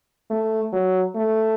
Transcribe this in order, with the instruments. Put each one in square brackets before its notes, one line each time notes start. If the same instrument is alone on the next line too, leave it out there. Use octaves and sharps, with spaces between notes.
[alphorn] A3
F#3
A3